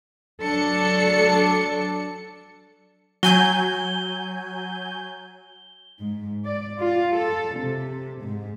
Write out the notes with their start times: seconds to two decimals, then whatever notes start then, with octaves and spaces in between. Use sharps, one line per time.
0.42 F#3 D4 A4 C#7
3.23 F#3 G#5 G6 G7
6.01 G#2
6.45 D5
6.80 F4
7.16 A4
7.58 C3
8.23 G#2